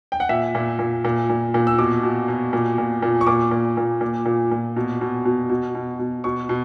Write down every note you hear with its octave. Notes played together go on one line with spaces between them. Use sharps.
G5
F#5
A#2 E5
A#2
A#2
A#2
A#2
A#2
E6
B2 D6
B2
B2
A#2
A#2
A#2
C#6
A#2 D6
A#2
A#2
A#2
A#2
A#2
B2
B2
B2
B2
B2
B2
B2 C#6
B2